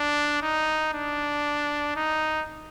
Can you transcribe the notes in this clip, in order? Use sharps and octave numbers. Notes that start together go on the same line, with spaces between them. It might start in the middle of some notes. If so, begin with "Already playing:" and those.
Already playing: D4
D#4
D4
D#4